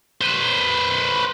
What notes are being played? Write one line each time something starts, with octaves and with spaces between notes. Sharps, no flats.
B4 C5